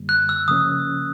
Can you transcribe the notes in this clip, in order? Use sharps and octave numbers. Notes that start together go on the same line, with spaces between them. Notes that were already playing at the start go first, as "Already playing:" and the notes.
Already playing: F#2 D3 G3 A#3
F#6
E6
C#3 F3 A#3 C#4 D#6